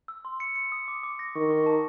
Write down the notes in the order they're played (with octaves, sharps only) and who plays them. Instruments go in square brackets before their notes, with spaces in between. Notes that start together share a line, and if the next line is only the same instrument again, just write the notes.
[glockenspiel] E6
C6
C#7
C#7
D#6
D6
D6
A#6
[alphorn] D#3 [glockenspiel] C#6
[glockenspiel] C#6
A5